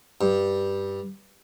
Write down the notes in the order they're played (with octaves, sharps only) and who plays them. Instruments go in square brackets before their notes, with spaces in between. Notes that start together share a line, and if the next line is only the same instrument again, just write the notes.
[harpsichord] G2